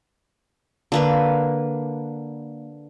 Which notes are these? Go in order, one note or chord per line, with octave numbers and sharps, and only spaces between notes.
D3 A#3 B4